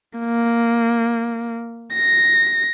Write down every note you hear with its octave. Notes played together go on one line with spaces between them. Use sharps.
A#3
A#6